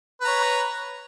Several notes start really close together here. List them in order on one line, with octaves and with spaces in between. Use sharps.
B4 A#5 C#5